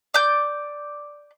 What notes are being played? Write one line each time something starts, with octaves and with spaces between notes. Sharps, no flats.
D5 G6